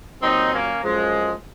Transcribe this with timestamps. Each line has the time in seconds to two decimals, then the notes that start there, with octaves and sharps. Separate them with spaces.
0.22 A#2 F#3 C4 D#4
0.52 A#3 C#4
0.84 F#2 F3 G#3